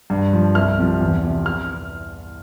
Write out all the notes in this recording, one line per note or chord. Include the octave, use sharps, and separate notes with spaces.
G2
F3
C2 F6
C3 F3
E2
C3 F3
F6